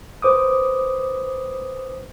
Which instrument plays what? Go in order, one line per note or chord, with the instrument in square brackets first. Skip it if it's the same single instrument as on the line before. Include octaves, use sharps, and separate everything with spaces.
[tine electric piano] B4 C5 D6 D#6